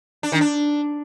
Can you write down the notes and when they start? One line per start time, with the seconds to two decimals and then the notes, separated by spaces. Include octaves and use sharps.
0.23 D4
0.32 D#3
0.41 D4